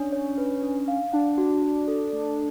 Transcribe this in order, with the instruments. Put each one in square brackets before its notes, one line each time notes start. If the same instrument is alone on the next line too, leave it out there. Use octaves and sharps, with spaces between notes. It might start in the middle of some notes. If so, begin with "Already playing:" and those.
Already playing: [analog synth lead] C#4 [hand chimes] D4
[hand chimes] C#5
B4
D4
F5
[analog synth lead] D4 [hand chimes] F#5
[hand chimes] F#4
F#4
A4
A3